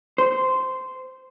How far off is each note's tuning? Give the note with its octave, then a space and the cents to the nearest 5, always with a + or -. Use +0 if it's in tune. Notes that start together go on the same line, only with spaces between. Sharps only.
C5 -15